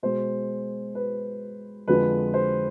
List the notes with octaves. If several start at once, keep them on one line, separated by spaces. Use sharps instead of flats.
B2 G#3 C5
B4
F2 D3 F3 G#3 B4
C5